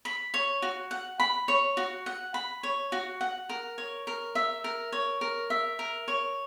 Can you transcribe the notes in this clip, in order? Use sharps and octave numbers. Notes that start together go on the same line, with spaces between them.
B5
C#5
F#4
F#5
B5
C#5
F#4
F#5
B5
C#5
F#4
F#5
A#4
C#5
A#4
E5
A#4
C#5
A#4
E5
A#4
C#5